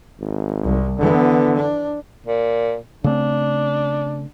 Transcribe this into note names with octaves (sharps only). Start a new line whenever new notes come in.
G#1
C2
D3 E3 B3
D4
A#2
C#3 A3 C4 D4